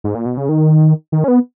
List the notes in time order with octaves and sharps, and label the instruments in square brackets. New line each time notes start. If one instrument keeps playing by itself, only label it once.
[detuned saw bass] G#2
A#2
B2
C#3
D#3
D#3
C#4
B3